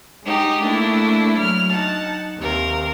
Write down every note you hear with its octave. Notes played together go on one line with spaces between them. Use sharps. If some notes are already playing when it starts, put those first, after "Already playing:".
G#3 D#4 G4
A3 A#3 D4 E4
F#3 F6
D#4 F#5 A5
D#2 C3 A#4 F5